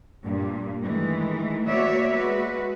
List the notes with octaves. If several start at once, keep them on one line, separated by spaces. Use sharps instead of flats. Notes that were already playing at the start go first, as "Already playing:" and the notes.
G2 A#2 G3
D#3 E3 G#3 A3
A#3 B3 F#4 C#5 D5 E5
G#3 F#4 B4